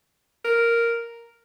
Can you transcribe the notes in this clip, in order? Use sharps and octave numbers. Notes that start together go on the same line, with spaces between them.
A#4